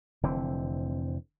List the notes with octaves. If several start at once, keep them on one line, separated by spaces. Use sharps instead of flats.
F1 D3 E3 C4